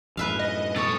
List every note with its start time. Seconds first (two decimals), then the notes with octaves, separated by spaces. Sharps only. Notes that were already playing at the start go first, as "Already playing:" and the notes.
0.17 F#2 A2 B4 E5 F5
0.39 D#5
0.76 B2 A4 C#5 D#6